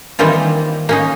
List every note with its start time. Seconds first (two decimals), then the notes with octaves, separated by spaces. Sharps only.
0.19 D#3 E3 G3 A#3 C4 F4
0.89 A#3 C#4 D#4